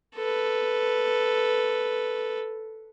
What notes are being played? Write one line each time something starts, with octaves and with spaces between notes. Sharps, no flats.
A4 B4